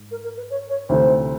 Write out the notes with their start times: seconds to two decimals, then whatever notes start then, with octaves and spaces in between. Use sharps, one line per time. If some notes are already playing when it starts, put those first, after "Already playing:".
Already playing: G#2
0.11 A#4
0.24 A#4
0.37 B4
0.50 C#5
0.70 C#5
0.89 D2 C3 E3 A3 C5